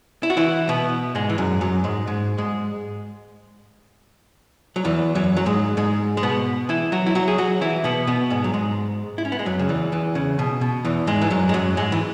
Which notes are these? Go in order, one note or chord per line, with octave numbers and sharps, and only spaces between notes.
E4
F#4
E3 E4
B2 B3
G#2 G#3
E3
F#2 F#3
F#2 F#3
G#2 G#3
G#2 G#3
G#2 G#3
F#3
E2 E3
F#2 F#3
F#3
G#2 G#3
G#2 G#3
G#3
B2 B3
E3 E4
F#3 F#4
E4
F#3 F#4
G#4
F#3 F#4
E3 E4
B2 B3
B2 B3
G#2 G#3
F#3
G#2 G#3
E4
C#4
B3
G#3
F#2 F#3
C#3
E2 E3
E2 E3
C#3
B2
B2
E2 E3
G#2 G#3
E3
F#2 F#3
G#3
F#2 F#3
G#2 G#3
E3